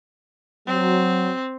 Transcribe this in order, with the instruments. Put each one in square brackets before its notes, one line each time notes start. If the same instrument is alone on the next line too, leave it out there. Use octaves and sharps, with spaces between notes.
[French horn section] F#3 [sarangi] C4